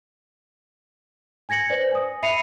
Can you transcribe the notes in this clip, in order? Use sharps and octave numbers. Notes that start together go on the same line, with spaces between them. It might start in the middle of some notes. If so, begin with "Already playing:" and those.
G#5 G#6 A#6 C#7 F#7
B4 C5 D5
G#5 D#6
E5 B5 C7 C#7 D#7 F7